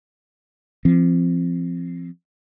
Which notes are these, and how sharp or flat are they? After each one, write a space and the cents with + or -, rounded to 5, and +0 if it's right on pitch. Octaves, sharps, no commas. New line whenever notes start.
F3 -25 C4 +0